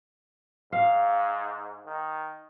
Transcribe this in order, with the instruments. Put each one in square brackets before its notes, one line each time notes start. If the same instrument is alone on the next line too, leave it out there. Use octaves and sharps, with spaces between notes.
[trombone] G#2 [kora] F5
[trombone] D#3